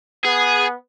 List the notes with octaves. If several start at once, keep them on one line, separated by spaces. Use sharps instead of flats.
B3 G#4